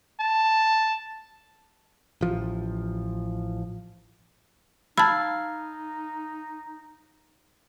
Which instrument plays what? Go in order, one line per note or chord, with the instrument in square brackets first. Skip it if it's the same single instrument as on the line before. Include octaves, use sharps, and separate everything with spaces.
[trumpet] A5
[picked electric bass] A1 F3
[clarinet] D#4 [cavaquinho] F5 [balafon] A5 B5 [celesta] E6 G#6 A6